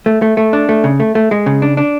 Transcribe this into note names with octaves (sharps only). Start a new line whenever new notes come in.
A3
A3
A3
D4
A3
C#3
A3
A3
G#3
C#3
D4
D4